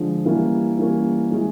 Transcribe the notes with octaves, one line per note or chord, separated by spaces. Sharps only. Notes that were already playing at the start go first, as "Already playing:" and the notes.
Already playing: D3 F3 G#3
E3 G3 A#3 C#4
E3 G3 A#3 C#4
E3 G#3 C#4